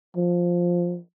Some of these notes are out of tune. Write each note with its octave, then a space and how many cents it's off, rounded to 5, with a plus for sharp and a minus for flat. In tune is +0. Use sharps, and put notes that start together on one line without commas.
F3 +5